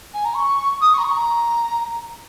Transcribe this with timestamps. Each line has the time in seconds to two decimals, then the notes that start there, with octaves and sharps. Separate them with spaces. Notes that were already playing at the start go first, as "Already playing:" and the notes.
0.14 G#5
0.25 A#5
0.36 C#6
0.81 D#6
0.93 C#6
0.98 A#5
1.04 C#6
1.16 A#5